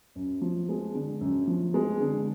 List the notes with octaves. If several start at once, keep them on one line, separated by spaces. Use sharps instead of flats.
F#2
F3
G#3
D3
F#2
F3
G#3
D3